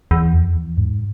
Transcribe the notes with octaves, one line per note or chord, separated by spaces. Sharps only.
E2
F2
E2
G#2